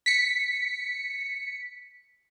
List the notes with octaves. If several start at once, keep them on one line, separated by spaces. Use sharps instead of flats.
B6 C#7